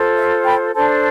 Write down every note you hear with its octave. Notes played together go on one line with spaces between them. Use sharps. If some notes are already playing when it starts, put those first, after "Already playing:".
Already playing: F4 A4 C5
E5
G5 B5
D4 A4 C5 A5 C6